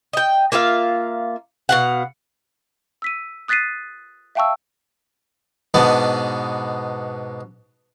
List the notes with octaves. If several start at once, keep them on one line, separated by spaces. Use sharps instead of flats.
D#5 G5
A#3 F4 E5 F5
B2 F5 F#5
E6 B6 D#7
D#6 F#6 A6 B6 C7 D#7
E5 F5 G5 A5 C#6 E6
G#2 B2 B3 D4 D5 D#5